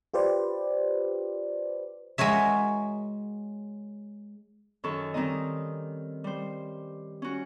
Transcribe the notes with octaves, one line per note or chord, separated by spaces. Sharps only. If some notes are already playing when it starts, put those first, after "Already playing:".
F4 G4 B4 C5 D5
G#3 F#4 A#4 C#5 E5
F#2 D#3 A4 C#6
D#3 G3 C4 D#4 D#5
G3 C5
C#4 F#4